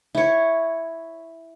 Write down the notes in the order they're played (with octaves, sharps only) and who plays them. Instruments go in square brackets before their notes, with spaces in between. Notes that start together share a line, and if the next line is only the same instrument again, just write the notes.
[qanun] E4 C#5